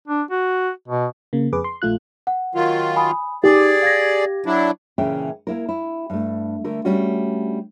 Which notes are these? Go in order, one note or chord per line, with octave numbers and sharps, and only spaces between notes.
D4
F#4
B2
C#3 A#3
F2 G#4 B4 D6
C6
A#1 A3 F4 F#6
F#5
D#3 F#3 F4
G#5 B5 D#6
D#4 G4 G#4 D5 D6
F5 G#6 A#6
F#3 D4 E4
A#2 C#3 E3 C#4 E5 G5
A#3 E4 A#4
E4
G2 A3
D3 A3 A#4
G3 A3 C#4 D4 F#4